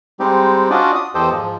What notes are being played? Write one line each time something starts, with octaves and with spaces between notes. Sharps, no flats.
G3 G#3 C4 D#4 G4
C#4 D4 F4 F#4 D5 D#5
D#6
E2 G4 A4 C5 D#5
G#2 F3